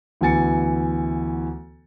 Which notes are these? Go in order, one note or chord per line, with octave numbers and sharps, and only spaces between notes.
D2 E3 B3 G#5 A6 C#7